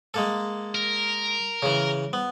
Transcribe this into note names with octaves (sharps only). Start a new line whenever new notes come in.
G#3 A#3 A4
A#4
C#3 E3
B3